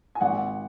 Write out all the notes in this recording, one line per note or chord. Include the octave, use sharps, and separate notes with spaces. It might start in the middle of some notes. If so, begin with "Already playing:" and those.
G#5
G#1 F#5